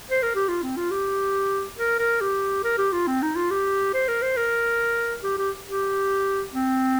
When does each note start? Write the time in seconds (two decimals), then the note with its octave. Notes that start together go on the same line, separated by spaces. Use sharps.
0.10 C5
0.23 A#4
0.35 G4
0.48 F4
0.63 C4
0.77 F4
0.91 G4
1.78 A#4
1.99 A#4
2.21 G4
2.64 A#4
2.78 G4
2.92 F4
3.07 C4
3.22 D#4
3.36 F4
3.51 G4
3.94 C5
4.08 A#4
4.22 C5
4.37 A#4
5.23 G4
5.38 G4
5.66 G4
6.53 C4